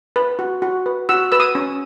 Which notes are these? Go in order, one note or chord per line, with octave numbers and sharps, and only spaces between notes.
B4
F#4
F#4
B4
F#4 E6
B4 E6
D#6
C#4